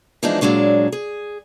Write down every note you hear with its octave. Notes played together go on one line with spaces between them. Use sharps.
E3 F3 G#3 B3 D4 D#4
A#2 F#3 G#3 D4 C#5
G#4